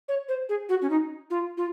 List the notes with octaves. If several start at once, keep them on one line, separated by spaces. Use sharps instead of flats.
C#5
C5
G#4
F#4
C#4
D#4
F4
F4